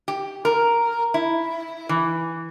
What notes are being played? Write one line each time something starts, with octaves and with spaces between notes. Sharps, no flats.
G4
A#4
E4
E3